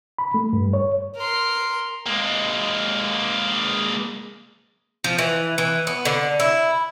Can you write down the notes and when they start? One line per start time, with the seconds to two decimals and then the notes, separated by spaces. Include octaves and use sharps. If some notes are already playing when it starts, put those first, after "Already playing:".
0.19 B5
0.34 A3
0.53 G2
0.73 C#5
1.17 A#4 C6
2.06 G#3 A#3
5.04 F3
5.18 E3
5.58 E3
5.87 B3
6.05 D3
6.40 E4